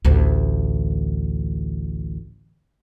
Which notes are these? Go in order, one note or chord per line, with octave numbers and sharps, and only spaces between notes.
A1 D2